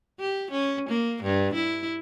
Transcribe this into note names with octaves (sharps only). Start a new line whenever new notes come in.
G4
C#4
A#3
G2
E4